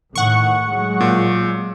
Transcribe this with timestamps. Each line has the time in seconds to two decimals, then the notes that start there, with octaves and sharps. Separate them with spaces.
0.15 A2 D#3 F#5 C#6
0.68 F#3 G#3
1.01 A#2